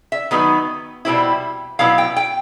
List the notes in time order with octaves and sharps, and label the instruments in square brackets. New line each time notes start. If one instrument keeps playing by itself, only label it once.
[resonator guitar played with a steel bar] E5
D#3 F#3 B3 D#4
B2 G3 C4 E4
B2 F#3 B3 E4 F5
G5
G5